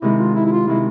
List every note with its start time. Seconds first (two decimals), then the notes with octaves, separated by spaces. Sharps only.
0.02 C3 D#3 G#3 E4
0.19 F4
0.35 E4
0.46 E4
0.52 F4
0.67 C3 D#3 G#3 E4